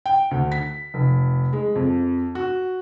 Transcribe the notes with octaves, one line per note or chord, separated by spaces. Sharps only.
G5
D2
B6
F1
G#3
F2
F#4